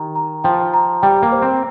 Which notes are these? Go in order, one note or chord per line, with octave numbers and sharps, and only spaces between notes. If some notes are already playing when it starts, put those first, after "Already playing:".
Already playing: D#3 G4 A#5
A#5
F3 G5
A#5
G3 G5
A#3
C5
C4